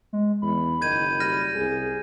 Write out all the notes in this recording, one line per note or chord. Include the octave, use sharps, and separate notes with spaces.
G#3
E2 B5
F#1 D#3 G6 G#6 D#7
G3 F6 A#6 D#7
C2 G#4